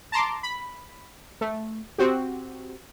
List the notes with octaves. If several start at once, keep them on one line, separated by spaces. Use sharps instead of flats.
A5 A#5 C6 D6
B5
A3
C4 F#4 G4